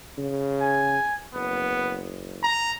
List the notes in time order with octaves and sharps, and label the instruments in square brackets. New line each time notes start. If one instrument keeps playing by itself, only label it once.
[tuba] C#3
[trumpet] G#5
[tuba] F#1 [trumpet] B3
[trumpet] A#5